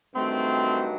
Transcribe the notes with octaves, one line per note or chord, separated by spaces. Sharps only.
G2 D#3 F#3 A3 C4